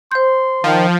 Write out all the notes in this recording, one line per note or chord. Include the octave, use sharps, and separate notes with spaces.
C5 C6 G6
D#3 F3